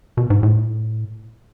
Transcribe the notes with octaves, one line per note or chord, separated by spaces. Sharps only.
B2
G#2
A2